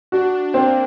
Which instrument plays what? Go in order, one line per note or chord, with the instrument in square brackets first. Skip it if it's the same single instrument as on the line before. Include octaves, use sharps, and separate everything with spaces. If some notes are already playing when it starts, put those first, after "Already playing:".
[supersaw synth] D4 [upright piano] F#4
[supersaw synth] A#3 [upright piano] C4